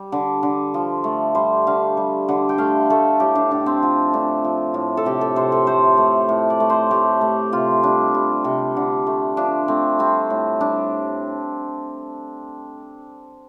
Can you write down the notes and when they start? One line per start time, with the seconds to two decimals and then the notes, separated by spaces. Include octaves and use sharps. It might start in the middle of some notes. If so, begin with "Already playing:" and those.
Already playing: G3
0.12 D3
0.43 D3
0.74 F3
1.04 A3
1.35 G3 C5
1.67 D3 F5
1.97 G3
2.29 D3
2.49 G5
2.58 A3 F5
2.90 A3 A4
3.20 A2 G4
3.35 D4
3.51 A2 D4
3.66 C4
3.83 F3
4.13 A3 D4
4.44 F3
4.74 A2
4.97 A4
5.05 C3 G4
5.21 A4
5.36 C3 C5
5.52 A4
5.67 A3 C5
5.98 A3
6.29 A2
6.50 D5
6.60 A3
6.70 C5
6.91 A3 G4
7.21 A3
7.52 C3 F4
7.83 G3 D4
8.14 G3
8.44 C3
8.76 D3
9.07 A3
9.37 F3 D4
9.68 A3 C4
9.99 G3 C4
10.30 A2
10.60 G3 D4